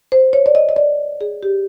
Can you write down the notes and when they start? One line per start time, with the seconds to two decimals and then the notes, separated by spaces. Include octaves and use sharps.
0.12 C5
0.33 C#5
0.46 D5
0.55 D#5
0.69 D#5
0.76 D5
1.21 G#4
1.43 G4